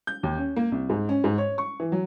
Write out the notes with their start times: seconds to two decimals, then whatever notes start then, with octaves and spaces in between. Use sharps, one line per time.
0.07 G6
0.23 D#2
0.38 C#4
0.56 A#3
0.72 C2
0.90 G#2
1.09 C#4
1.24 G#2
1.38 C#5
1.58 C#6
1.80 E3
1.92 F#3